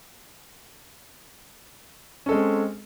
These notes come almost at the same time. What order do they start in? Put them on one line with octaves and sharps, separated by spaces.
C#4 A4 G#3 C4